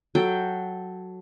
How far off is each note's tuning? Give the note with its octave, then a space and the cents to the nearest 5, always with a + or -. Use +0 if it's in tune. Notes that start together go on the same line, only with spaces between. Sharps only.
F#3 +0 A4 +0 G5 +5